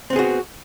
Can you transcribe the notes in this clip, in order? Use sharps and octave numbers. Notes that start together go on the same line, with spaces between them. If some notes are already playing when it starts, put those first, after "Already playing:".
B3 C4 F#4 G#4